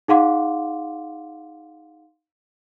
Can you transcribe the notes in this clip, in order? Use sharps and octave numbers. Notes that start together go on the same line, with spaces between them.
D#4 G#4 F5 F#5 C6 D6